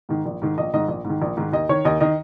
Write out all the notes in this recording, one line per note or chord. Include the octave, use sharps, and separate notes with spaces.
G#2 D#3
A#1
G#2 D#3
A#1 D#5
G#2 D#3 D#5
A#1
G#2
D#3
A#1
G#2 D#3
D#2 D#5
D#3 C#5
D#2 D#5
D#3 D#5